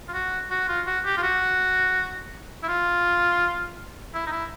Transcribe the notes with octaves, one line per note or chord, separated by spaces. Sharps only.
F4
F#4
F#4
F4
F#4
G4
F4
F#4
E4
F4
E4
D#4
E4